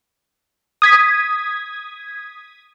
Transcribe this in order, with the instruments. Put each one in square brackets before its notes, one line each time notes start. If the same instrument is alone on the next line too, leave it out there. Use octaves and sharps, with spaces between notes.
[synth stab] D#6 G#6 B6